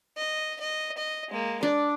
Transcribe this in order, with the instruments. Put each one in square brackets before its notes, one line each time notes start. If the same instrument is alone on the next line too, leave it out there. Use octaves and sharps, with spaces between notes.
[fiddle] D#5
D#5
D#5
G#3 A#3
[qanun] D4 [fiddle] D5